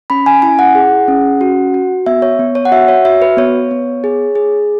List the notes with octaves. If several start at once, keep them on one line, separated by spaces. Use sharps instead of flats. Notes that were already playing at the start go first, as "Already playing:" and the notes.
C#4 B5
G#5
E4 G#5
F#5
G#4
C#4
F#4
F#4
B3 E5
C#5
B3
C#5
F#5
F#4 E5
C#5
F#4 E5
B4
B3 C#5
B3
G#4
G#4